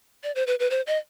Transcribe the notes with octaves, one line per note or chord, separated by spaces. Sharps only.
D5
C5
B4
B4
C5
D#5